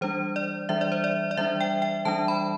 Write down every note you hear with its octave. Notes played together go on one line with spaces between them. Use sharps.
E3 G3 D4 C5
D5
E3 G3 D4 E5
D5
C5
D5
D5
E3 G3 D4 E5
G5
G5
E3 G3 D4 A5
B5